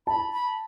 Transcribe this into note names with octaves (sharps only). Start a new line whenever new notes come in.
A5 B5
B5